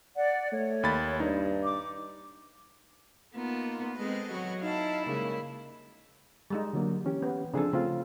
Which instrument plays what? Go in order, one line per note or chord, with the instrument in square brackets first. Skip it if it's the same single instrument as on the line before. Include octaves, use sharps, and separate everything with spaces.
[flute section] D5 F#5
[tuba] A3 [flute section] C#5
[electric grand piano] D#2 B5 A6
[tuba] G2 [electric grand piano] D#4
[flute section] D6
[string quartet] A#3 D#4 F4 [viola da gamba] B3
[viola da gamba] G#3 C4 [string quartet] A4 B4 D#5
[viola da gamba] F#3 F#4
[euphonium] D#4 [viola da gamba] E4 [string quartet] F5 A5
[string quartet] C#3 G3 G#3 [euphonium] A#3
[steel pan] G3 G#3 D#4
[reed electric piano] D3 F#3 A#3
E3 C#4 G4
[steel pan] B3
[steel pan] C#3 F3 A4 [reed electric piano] C4 D4 G#4
[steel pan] C#3 [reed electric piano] A3 C4 F4